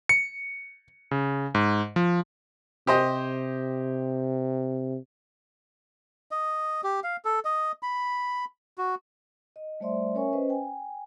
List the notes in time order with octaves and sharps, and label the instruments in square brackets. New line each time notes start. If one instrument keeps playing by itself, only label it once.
[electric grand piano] C#7
C#3
G#2
F3
[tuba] C3 [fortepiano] G4 C5 D#5
[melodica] D#5
G4
F5
A4
D#5
B5
F#4
[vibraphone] D#5
G3 A3 C5 D5 E5 C6
C#4 A#4 C#5 E5 G#5 C#6
C#4 B4 C5 D#5
G5 G#5